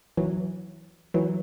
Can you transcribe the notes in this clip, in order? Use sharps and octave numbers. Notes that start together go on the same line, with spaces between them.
E3 F#3
E3 F#3